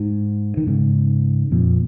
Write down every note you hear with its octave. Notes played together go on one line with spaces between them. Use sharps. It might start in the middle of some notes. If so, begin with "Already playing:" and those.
Already playing: G#2
D#3
G#2 C#3
F2 A#2